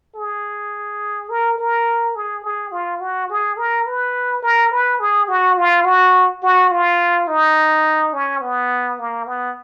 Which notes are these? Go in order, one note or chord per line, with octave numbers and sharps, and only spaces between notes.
G#4
A#4
A#4
G#4
G#4
F4
F#4
G#4
A#4
B4
A#4
B4
G#4
F#4
F4
F#4
F#4
F4
D#4
C#4
B3
A#3
B3